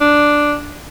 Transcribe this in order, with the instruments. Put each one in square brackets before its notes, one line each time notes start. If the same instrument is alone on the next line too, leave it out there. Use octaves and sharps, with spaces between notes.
[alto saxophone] D4